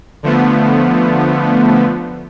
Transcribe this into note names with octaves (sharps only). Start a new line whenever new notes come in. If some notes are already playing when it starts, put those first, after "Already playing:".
D3 F3 A3 B3